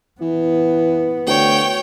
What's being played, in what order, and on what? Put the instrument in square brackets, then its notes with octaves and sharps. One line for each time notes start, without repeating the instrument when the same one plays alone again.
[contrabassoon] E3 [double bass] B3
[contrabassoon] D2 [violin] C#5 G5